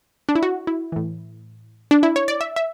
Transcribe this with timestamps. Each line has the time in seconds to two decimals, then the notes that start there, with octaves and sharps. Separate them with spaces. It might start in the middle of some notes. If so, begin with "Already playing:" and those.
0.29 D4
0.35 E4
0.43 F#4
0.67 E4
0.92 A2 E3
1.91 D4
2.03 E4
2.16 C#5
2.28 D5
2.41 E5
2.56 E5